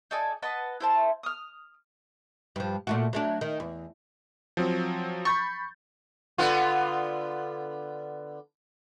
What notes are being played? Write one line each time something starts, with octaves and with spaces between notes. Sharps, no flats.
D#4 A4 D5 G#5
B4 D#5 F#5 A5
E4 C5 A5
D#6 F6
G2 F3
A#2 A3 F#4
F#3 A3 D4
D#3
E2
F3 F#3 C4
B5 C#6 G6 A6
D3 B3 F4